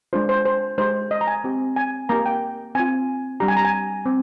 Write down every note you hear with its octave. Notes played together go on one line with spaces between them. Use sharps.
G#3 D4 F4 C5
C5
C5
G#3 D#4 G4 C5
D#5
A#5
G#5
C4 G4
G#5
A#3 D#4 G4 A#5
G5
C4 F4 G#5
G3 D4 G4 A#5
G#5
A#5
G#5
C4